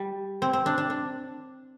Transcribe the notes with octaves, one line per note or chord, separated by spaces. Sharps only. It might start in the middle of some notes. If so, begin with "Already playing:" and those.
Already playing: G3
C4
C4
D4
D4
D4